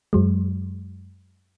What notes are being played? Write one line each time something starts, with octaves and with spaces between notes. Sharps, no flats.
F#2 F#3 G#3